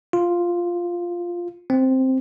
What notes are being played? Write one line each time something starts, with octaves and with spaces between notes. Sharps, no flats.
F4
C4